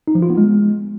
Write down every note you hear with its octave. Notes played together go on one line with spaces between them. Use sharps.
D#4
F3
F4
B3
G#3